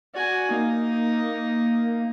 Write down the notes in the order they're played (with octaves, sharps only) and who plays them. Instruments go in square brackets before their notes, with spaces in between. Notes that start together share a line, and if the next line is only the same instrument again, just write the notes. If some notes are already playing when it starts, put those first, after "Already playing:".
[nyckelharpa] F#4 G#5 [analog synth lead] D5
[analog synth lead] A#3 [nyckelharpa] D#4